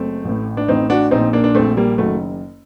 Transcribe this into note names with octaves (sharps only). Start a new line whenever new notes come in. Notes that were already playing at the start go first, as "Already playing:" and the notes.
Already playing: F#1 F#2 A3 C4
A1 A2
D4
A1 A2 C4 D#4
D4 F#4
A#1 A#2 C4 D#4
A#3 D4
D4
A#1 A#2 A3 C4
G3 A#3
F#1 F#2 D#3 F#3 A3